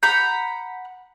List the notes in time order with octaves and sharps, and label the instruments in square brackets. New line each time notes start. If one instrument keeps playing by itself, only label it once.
[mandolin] F#5 A#5 B5 G6